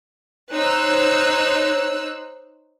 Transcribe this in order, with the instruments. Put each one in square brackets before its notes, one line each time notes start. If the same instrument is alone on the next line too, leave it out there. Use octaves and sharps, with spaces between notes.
[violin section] D#4 C5 C#5 E6 F#6